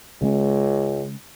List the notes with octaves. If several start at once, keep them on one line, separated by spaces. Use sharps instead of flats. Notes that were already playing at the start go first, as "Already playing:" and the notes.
C#2 C#3 G#3 C#4